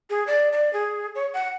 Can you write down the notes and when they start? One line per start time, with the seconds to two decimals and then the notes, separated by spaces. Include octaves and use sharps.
0.10 G#4
0.27 D5
0.52 D5
0.73 G#4
1.15 C#5
1.34 F#5